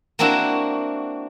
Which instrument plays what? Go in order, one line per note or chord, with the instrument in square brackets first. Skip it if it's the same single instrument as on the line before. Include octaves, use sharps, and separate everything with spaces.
[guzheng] A#3 C4 D4 E4 F#4